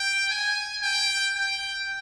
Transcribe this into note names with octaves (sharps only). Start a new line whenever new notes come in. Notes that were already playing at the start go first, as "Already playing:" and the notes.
Already playing: G5
G#5
G5
G5